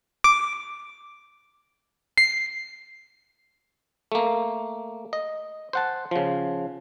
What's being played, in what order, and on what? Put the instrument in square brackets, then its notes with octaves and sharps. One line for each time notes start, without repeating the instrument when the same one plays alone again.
[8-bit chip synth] D6
C7
[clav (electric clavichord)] A3 A#3
D#5
C5 F#5 A5
C#3 F3